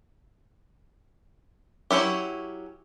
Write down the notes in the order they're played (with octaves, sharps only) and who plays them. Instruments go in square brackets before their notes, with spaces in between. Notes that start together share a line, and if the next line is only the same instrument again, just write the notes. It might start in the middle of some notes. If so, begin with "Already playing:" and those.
[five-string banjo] F#3 C#4 E4 G4